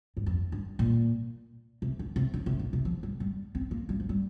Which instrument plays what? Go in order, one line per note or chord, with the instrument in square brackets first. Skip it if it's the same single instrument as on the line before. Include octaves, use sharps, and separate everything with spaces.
[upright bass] G2
F2
G2
A#2
C3
D3
C3
D3
C3
D3
C3
F3
G3
G3
C4
A#3
G3
F3
G3